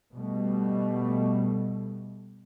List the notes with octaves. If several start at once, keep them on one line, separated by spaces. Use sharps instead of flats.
B2 G3 A3